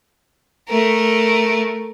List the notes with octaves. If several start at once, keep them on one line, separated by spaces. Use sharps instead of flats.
A3 A#4